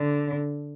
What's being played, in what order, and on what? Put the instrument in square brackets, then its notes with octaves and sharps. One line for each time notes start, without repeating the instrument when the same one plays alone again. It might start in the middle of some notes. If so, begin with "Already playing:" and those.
Already playing: [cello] D3